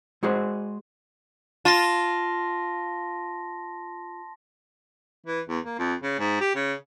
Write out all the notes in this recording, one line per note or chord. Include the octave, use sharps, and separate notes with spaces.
G#3 F#4 G#4 C5
F4 A5 C6 A#6
E3
E2
A#3
F2
C#3
G#2
G4
C#3